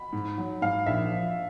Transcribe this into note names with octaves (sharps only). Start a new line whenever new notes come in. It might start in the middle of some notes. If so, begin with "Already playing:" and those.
Already playing: B5
G#2
F#3
G#2 F5
A#1 E5
F3